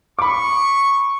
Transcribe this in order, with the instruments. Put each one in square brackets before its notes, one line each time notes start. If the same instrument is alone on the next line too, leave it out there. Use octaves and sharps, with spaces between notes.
[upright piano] B5 D6 [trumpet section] C#6